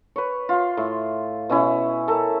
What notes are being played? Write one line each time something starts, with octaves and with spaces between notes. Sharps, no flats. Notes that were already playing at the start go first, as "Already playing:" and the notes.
B4 C#5
F4 C6
A2
B2 C#4 E4
A4 A#4 E5